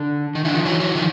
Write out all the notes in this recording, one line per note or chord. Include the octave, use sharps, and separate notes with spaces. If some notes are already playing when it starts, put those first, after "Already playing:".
Already playing: D3
D#3
D3 E3
D#3 F3
E3 F#3
E3 F#3
D#3 F3